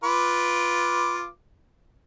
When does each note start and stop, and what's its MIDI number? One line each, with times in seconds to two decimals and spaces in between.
0.04 1.27 65
0.04 1.27 71
0.04 1.27 86